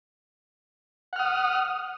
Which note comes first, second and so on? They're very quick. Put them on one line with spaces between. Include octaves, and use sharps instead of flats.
F#5 F6 D#6